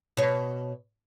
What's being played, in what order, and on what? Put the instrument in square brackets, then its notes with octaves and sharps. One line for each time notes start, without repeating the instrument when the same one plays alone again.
[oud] B2 C#5